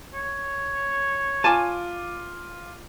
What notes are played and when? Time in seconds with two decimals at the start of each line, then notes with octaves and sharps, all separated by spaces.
0.13 C#5
1.44 F4 G#5 A5 D6